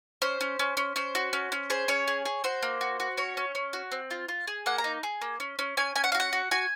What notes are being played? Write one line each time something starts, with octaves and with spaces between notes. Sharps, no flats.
C#4 C5
C#4
C#4
C#4
C#4 C5
F#4
C#4
C#4
G#4 C5
C#4 C#5
G#4
G#4
F#4 C5
A#3
F#4
F#4
C#4 C#5
C#4
C#4
F#4
C4
F4
F4
G#4
A#3 F#5
A#5
D#4
G#4
A#3
C#4
C#4
C#4 G#5
C#4 G#5
F#5
F5
F#4
F#5
F#4
F#4 G#5